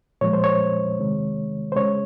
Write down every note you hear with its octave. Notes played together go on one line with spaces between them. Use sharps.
A#2 F3 G#3 C#5
C5
C#5
C3 D#3 G#3
C5
C#3 G#3 C#5